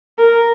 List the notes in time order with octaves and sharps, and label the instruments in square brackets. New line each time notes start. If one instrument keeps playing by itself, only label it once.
[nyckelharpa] A#4